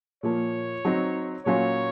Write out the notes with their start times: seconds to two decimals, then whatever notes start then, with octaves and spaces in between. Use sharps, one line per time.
0.23 A#2 F3 A#3 C#5
0.85 F#3 C4 D#4
1.46 A#2 F#3 C#4 F4 C#5